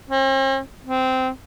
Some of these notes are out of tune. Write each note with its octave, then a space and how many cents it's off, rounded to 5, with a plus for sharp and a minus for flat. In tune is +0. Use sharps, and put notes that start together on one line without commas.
C4 +45
C4 -15